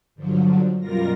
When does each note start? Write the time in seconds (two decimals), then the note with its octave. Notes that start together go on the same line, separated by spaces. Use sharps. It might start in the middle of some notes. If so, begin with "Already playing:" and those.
0.15 G2 D3 F3 F#3
0.81 F#2 B2 G3 F4 A#4 A#6